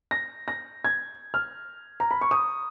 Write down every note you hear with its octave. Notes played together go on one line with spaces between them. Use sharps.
A#6
A#6
G#6
F6
A#5
B5
C#6
D#6